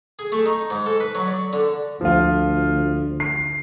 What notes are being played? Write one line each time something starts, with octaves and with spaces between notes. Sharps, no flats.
G#4
A3
D#4
G#2
A4
B4
F#3
D5
D3
D2 F3 F4
C7